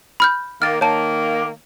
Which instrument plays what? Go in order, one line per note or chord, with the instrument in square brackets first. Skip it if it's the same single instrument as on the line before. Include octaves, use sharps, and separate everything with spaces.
[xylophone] B5 F6 G6
[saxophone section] D#3 A#3 [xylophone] F6 A6
[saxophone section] D#3 A#3 [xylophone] C#5 A5